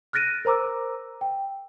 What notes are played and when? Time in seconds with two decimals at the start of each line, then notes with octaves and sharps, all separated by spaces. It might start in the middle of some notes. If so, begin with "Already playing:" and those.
0.13 F6 F#6 A6 A#6 D7 D#7
0.45 A#4 C5 A#5 D6 E6
1.21 G5